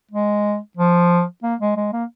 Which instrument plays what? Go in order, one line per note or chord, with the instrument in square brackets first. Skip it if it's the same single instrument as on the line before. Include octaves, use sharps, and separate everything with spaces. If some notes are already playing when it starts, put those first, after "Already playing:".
[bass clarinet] G#3
F3
A#3
G#3
G#3
A#3